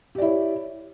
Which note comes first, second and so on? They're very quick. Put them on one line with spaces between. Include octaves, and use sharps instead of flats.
G4 D5 E4 C#5